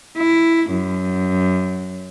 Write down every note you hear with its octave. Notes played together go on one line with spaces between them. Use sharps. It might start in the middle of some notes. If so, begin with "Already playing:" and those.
E4
F#2